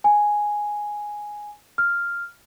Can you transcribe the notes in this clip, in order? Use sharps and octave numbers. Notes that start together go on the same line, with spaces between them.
G#5
F6